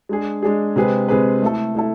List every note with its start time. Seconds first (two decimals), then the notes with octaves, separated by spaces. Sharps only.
0.09 G#3 D4 G#4
0.43 G#3 D4 G#4
0.76 C3 G#3 C4 G#4 B4
1.08 C3 G#3 C4 G#4 B4
1.42 A3 E4 A4
1.75 A3 E4 A4